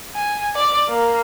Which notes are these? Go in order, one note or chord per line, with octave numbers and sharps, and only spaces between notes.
G#5
D5
A#3